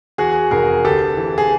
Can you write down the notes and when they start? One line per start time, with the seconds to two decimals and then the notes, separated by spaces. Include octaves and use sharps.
0.18 E2 F#4 G#4
0.51 F1 G#4 A#4
0.84 D2 G4 A4
1.17 E3
1.38 G#4